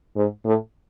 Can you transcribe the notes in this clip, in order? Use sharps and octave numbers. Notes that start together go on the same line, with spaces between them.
G#2
A2